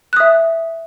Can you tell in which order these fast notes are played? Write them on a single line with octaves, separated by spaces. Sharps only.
F#6 D#6 E5